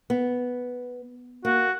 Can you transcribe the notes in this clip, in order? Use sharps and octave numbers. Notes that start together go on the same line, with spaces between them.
B3
A#3 F#4